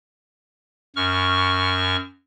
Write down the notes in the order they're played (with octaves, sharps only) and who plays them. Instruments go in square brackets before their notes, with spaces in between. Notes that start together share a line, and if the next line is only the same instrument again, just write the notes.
[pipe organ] F#2 C#6 F6